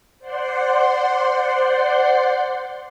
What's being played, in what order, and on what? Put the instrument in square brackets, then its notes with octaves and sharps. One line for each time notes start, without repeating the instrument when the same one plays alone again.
[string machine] C5 D5 F#5 C6